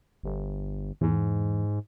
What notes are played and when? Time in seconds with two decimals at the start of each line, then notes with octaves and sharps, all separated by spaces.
0.24 G1
1.01 E2 G#2